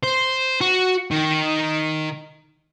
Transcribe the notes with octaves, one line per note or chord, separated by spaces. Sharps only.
C5
F#4
D#3